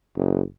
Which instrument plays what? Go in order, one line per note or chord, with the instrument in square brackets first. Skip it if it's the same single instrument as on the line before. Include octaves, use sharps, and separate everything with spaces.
[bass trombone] F#1